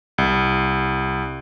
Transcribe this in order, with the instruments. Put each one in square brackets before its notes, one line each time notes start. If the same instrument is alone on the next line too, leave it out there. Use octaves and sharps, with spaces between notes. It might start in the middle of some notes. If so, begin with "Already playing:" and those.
[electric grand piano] C2